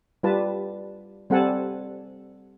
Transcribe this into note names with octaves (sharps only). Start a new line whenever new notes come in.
G3 F4 B4 A5
G3 C4 A4 F#5 G#5 A5